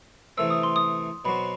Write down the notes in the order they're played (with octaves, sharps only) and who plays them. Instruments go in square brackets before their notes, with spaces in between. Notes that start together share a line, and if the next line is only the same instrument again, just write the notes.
[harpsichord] C3 E3 A3 C4 [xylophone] E6
[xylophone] D#6
C6
D#6
[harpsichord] B2 F#3 C4 F#4 [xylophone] B5